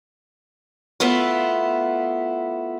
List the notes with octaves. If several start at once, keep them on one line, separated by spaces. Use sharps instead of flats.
A3 B3 E4 F4